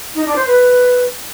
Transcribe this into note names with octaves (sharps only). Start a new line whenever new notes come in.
D#4
D4
C5
B4